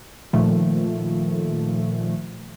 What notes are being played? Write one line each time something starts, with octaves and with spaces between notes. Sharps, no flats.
A#2 D#3 F3 A3